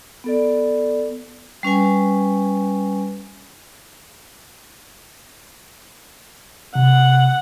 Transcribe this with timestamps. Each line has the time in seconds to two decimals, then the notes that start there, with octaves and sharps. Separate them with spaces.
0.24 B3 A4 D5
1.63 G3 C#4 B4 G#5
6.75 C3 F#5